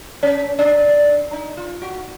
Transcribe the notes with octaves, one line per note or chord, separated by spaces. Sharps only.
C#4
D4
D#4
F4
F#4